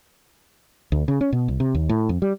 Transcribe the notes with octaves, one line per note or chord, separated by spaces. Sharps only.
D2
C#3
C#4
B2
C2
C3
D#2
A2
F2
G3